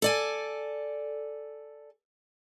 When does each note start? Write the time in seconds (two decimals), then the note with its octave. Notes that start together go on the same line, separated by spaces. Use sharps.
0.02 A4 D5 G#5